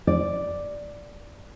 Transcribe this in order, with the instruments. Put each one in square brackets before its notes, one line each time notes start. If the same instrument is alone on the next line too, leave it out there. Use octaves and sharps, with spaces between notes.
[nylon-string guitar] D5